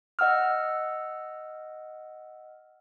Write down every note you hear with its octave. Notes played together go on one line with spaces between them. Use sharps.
D#5 F#5 E6 F6